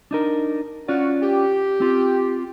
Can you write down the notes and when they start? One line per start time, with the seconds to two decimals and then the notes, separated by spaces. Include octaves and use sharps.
0.11 D4 D#4 A#4
0.88 C#4 F4 F#4 D5
1.23 G4
1.80 C4 F4